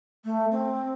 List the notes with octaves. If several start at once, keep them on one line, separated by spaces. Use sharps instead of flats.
A3
C4